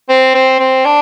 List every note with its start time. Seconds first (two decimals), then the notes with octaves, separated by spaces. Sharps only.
0.09 C4
0.34 C4
0.59 C4
0.85 D4